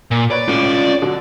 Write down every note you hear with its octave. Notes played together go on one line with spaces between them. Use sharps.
A#2
B4 C#5 D5
A2 C#4 F4
B2 D3 F#3